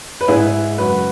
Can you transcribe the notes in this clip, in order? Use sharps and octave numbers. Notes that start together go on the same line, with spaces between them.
B4
G#2 G#3 E4 G#4
F#2 C#3 G#3 F#4 B4